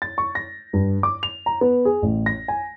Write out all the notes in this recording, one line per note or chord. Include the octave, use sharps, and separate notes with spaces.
A6
C#6
A#6
G2
D6
F7
A#5
B3
G#4
A1
A#6
G#5